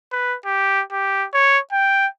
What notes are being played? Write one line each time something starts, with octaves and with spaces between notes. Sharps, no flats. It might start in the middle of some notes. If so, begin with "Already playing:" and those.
B4
G4
G4
C#5
G5